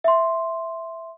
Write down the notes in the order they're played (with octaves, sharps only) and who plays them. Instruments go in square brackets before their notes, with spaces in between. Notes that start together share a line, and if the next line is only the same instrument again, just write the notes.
[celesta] E5 C6